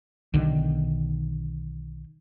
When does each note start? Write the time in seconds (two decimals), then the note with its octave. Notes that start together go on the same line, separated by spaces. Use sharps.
0.34 B1 D3 D#3